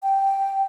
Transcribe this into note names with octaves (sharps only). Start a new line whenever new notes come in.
G5